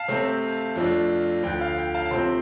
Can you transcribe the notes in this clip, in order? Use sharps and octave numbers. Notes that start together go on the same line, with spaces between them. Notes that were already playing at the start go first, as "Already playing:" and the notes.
Already playing: F5 A5
C3 A3 C4
F2 F3 A3 D4
D2 D3 F3 G5
F5
G5
F5 A5
C3 F3 A3 C4 G5 C6